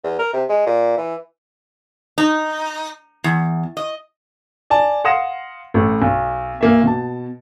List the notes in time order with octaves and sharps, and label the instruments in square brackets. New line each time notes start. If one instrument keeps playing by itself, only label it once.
[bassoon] E2
A#4
C3
G#3
A#2
E3
[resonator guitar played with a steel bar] D#4
E2
D#5
[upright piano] D5 G#5 A5
F5 F#5 C6 D#6 A#6 E7
A1 A3
B1
B1 A#3 E5
B2 A5